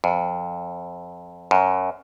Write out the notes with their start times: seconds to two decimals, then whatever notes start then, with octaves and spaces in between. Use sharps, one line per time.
0.04 F2
1.51 F#2